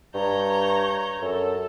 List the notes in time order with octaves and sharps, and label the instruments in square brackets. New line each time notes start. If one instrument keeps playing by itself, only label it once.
[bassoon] G2 [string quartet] C#5 A#5 G6
[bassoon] F#2 [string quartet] A4